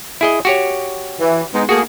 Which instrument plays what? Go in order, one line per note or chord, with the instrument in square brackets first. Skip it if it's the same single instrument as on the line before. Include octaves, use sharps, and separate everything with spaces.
[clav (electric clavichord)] E4 G#4 D#5
F#4 G4 C#5
[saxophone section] E3
G#3 B3 D#4
[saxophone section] A3 A#3 G#4 [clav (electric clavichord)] F#4